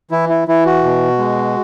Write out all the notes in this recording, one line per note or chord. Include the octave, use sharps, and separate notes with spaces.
E3 E4
E4
E3 E4
F#4
B2
G#3